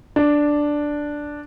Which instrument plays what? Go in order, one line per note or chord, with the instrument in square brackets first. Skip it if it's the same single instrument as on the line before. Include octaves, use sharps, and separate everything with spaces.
[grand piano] D4